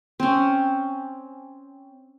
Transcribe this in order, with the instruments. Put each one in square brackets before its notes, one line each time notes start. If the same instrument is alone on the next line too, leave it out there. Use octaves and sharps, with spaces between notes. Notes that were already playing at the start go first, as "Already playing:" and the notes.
[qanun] C4 C#4